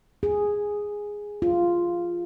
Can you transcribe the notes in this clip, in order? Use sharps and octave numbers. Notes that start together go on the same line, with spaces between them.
G#4
F4